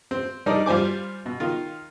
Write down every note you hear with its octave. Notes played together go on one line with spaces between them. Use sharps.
C4
G3 D4 D#4 A#4 D5
G3 F4 C5 G#5 D6
B2
D#3 F4